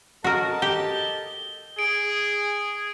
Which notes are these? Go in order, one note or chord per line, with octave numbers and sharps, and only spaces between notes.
F#4 A4 A#4 D#5 A5
G4 G7
G#4 D7